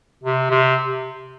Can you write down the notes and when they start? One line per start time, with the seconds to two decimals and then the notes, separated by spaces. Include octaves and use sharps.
0.23 C3
0.51 C3